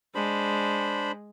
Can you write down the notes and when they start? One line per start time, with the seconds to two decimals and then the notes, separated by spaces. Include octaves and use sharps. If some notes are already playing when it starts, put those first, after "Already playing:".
0.15 G#3 D4 C5 B5